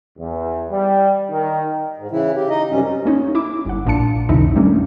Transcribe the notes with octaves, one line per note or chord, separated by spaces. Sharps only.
E2
G3
D#3
G#2
C#3 E3 E4
G4
D#4 D#5
F#2 C3 G3 C#4
A#3 C#4 D#4 F4
E4 D6
G1 F#5
A#1 A#2 D4 A5 C#7
C#2 F#2 C3 D#3 D#4 E4
G3 A3 A#3 C#4 D4